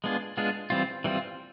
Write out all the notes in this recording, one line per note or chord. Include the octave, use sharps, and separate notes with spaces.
G#3 B3 D4 F4 G#4
G#3 B3 D4 F4 G#4
E3 G3 C4 F4
E3 G3 C4 F4